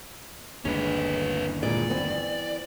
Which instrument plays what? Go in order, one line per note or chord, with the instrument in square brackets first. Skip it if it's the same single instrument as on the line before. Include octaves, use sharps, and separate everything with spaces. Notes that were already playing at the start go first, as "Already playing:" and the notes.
[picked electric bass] G1 D#2 D4 [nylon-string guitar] G#3 [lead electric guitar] C#4 B4
[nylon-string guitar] A#2 E3 G#3 [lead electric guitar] D5
[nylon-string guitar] E3 B3 C4